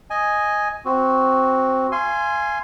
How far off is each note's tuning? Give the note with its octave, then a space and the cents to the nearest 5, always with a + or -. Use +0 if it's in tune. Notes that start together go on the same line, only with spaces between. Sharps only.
D#5 +0 G#5 +0
C4 +0 F#4 +0
F5 -35 G#5 +0 C6 +0